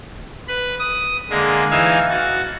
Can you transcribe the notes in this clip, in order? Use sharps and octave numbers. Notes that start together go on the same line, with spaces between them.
B4 B5
D#6
D3 G#3 A#3
E3 D#4 F5 E6 G#6
F#4 A6